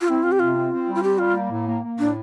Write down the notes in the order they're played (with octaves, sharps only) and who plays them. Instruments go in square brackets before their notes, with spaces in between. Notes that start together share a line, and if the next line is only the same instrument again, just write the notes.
[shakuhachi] F4
[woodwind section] C4 [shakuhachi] E4
[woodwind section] C4 [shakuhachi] F4
[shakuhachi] G4
[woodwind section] C3 [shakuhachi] F4
[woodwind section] C4
C4
G3
[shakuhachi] F4
[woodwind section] C4 [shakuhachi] G4
[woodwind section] G3 [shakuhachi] F4
[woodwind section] A#3
A2
A#3
A#3
[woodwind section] A2 [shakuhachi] D4